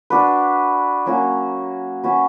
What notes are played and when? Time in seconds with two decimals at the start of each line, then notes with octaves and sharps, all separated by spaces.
0.10 D4 F#4 B4
1.06 F#3 A#3 C#4 F#4
2.03 C#4 F#4 B4